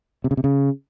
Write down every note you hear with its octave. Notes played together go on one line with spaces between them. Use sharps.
C3
C#3
C3
C#3